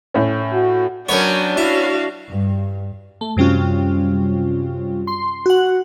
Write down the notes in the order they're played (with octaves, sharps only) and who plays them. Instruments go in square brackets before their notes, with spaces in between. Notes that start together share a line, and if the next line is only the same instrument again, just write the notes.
[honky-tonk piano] A2 C#4
[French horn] F#4
[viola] F#3 G5 [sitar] B3 C#4 [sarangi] D4 [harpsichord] A#4 C#5
[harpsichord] E4 [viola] F#4 F5
[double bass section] G2
[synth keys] A3
F#2 C3 G3 C#4 F4
C6
F#4 F#5